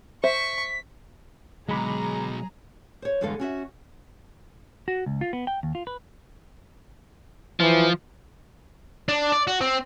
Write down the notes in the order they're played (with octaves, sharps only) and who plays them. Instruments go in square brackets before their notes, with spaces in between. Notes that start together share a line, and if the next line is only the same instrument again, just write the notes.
[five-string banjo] C5 E5 [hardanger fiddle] C#6 [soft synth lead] B6
[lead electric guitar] B2 F#3 [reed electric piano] D3 B5 D6 [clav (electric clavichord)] G#3 [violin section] G#4 A#5
[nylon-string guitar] C5 C#5
E2 G2 D3 G#3 A4 F5
C#4 F#4 E5 F#5
[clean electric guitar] F#4
C#2
F4
B3
G5
D#2
F4
B4
[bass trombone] E3 [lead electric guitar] F3
[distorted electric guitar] D4
D5
F#4
C4